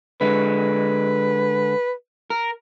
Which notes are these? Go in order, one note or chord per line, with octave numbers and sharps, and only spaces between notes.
D3 G#3 B4
A#4